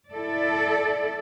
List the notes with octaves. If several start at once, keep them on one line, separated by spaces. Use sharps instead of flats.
E4 A4 D5